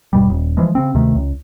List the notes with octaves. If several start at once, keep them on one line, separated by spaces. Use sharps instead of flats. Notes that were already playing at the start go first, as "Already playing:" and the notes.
E1 G2 B2 G3
D#1
E3 F3 G#3
C#3 C4
D2 C3 D#3 A3
C#2